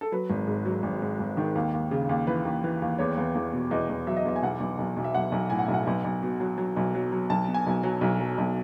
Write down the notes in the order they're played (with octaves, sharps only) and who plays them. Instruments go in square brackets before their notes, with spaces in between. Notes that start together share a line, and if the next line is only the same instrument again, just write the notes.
[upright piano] A4
F#3 B4
G#1
G#2
F#3
G#1
G#2
G#1
D#3
D#2
D#2
C#3
D#2
E3 B4
D#2
E3
D#2
E2 C#5
E2
E2
B2
E2 D#5
E2
F#3 E5
D#5
E2 E5
G#5
B1 F#5
B1
B1
B1
E5
B1 F#5
B1
A2 G#5
F#5
E5
B1
F#5
B1
B1
B2
F#3
F#3
B1
F#3
F#3
B1 A5
B2
G#5
B1
F#3
B1
F#3
B1